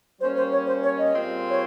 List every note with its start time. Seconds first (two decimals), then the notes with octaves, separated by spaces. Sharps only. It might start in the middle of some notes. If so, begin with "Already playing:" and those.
0.21 G3 A#3 C#4 C5
0.36 C5
0.52 C#5
0.67 C5
0.83 C#5
0.98 D#5
1.13 A#2 G3 C4 F4 G#4
1.50 C#5